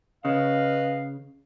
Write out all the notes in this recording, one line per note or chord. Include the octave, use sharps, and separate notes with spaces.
C#3 B4 D#5 F5